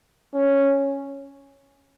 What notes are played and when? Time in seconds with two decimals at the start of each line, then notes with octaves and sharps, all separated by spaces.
0.34 C#4